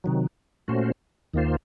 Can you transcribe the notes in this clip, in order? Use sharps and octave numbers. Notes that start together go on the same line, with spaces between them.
C3 D#3 F#3
A#2 A3 C#4 F#4 C5
D#2 D#3 A#3 F4 C5